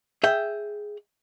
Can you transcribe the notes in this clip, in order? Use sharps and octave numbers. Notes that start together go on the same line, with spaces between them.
G#4 E5 G5